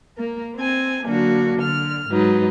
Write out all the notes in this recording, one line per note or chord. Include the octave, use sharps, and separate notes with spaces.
A#3 A#4
C4 G#5
D3 F#3 A#3 D4 F#4
D3 F6
G#2 F#3 D#4 B4